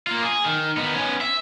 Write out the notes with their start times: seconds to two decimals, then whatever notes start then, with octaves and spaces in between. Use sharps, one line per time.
0.07 A#3 F4
0.22 G#4
0.45 D#3
0.77 D#3 B3
0.95 B3 C#4
1.21 E5